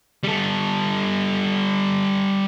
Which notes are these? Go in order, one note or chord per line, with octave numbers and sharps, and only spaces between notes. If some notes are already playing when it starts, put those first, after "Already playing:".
G3 A4